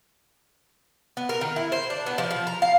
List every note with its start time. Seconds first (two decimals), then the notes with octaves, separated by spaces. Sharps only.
1.17 B3
1.29 A#4
1.41 D#3
1.56 E4
1.72 C5
1.90 D4
2.06 B3
2.18 F3
2.31 F3
2.47 A#5
2.62 F5